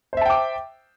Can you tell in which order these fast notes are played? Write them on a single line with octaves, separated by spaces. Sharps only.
C5 E5 A5 G5 D6